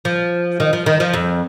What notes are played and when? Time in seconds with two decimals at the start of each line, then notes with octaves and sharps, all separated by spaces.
0.05 F3
0.60 D#3
0.73 F3
0.86 D#3
1.00 F3
1.14 F2